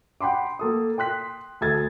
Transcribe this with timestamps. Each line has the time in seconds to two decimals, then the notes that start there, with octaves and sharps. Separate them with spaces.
0.21 F#5 G5 B5 C6 D6
0.59 A#3 A4 D#6
0.98 G5 C6 F#6 B6
1.61 D2 A4 G#6 A6